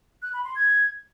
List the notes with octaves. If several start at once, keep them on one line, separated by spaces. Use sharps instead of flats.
F#6
B5
C6
G#6